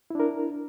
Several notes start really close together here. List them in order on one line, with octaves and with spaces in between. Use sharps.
E4 D4 A#4